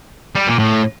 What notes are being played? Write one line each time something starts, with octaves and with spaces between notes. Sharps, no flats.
G3
A#2
A2